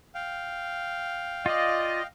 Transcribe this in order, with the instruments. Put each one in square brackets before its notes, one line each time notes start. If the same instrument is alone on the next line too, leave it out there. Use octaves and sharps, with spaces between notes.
[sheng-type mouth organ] F5 G5
[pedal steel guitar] F4 D5 [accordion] D#5